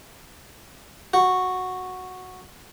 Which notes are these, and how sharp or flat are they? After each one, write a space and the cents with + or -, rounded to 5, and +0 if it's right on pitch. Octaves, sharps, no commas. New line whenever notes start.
F#4 -5